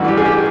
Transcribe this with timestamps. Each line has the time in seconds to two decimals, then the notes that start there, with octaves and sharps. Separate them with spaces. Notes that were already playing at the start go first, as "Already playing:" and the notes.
Already playing: A1 G2 E3 F#4
0.08 G4
0.17 G#4
0.25 G4